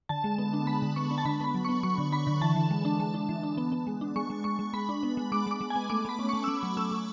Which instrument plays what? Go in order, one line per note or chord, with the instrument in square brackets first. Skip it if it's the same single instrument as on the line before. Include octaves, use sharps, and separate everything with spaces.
[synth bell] D3 A5
G#3
B3
D4
G#3 B5
D3
B3 C#6
D4
A5
D3 B5
B3 B5
F#3
B3 C#6
F#3 C#6
D3
D4 B5
D3
E3 A5
E3
G#3
D4
G#3
D4
E3
D4
B3
B3
G#3
D4
G#3 C#6
G#3
G#3 C#6
G#3
G#3 B5
D4
B3
G#3
G#3 D6
G#3 D6
G#3
G#5
B3
A3 D6
A3 B5
C#4
A3 C#6
E6
A3 D6
F#3
A3 E6
A3